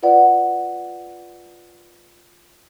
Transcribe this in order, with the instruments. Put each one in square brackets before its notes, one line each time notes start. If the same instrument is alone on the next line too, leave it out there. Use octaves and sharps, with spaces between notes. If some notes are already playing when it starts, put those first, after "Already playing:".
[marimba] F4 B4 D5 F#5